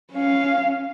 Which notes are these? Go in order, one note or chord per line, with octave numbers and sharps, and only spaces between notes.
C#4 F5